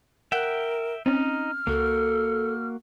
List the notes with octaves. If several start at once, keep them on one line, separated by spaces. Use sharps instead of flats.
A#4 E5 F#5 G5 F#6
C4 C#4 D#4 F6
C#2 A#3 F#4 A4